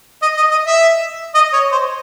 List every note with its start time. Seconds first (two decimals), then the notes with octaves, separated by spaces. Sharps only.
0.22 D#5
0.37 D#5
0.51 D#5
0.65 E5
1.35 D#5
1.53 C#5
1.72 C5